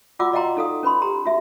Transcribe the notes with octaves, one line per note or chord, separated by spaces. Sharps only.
F4 F#4 D5 F#5 D6 E6
D5 D#5 F5 G5 A#5 C6
D#4 A4 F5 D#6
C#4 B4 B5 C6
G4 A#5 C6
F#4 E5